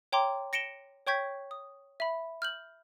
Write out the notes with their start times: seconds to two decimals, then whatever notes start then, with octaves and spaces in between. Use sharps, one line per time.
0.12 C#5 G5 A#5 C6 D6
0.53 A#6 C#7 D7 E7 G7
1.07 C#5 G5 C#6 G6 G#6 B6
1.51 D#6
2.00 E5 B5
2.42 F6 G6 F#7